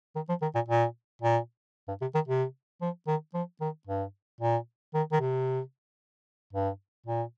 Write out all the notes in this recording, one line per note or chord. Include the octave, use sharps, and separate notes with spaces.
D#3
F3
D#3
A#2
A#2
A#2
G2
C3
D#3
C3
F3
D#3
F3
D#3
G2
A#2
D#3
D#3
C3
G2
A#2